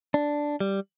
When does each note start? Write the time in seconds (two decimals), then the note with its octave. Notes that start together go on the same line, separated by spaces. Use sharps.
0.14 D4
0.60 G3